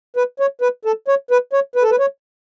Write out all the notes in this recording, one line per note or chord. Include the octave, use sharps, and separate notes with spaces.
B4
C#5
B4
A4
C#5
B4
C#5
B4
A4
B4
C#5